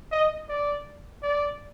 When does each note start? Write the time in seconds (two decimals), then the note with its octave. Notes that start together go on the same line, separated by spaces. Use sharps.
0.12 D#5
0.49 D5
1.23 D5